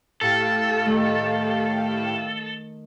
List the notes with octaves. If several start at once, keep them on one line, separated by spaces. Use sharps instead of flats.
A2 G4 A4 F5
D#3 A3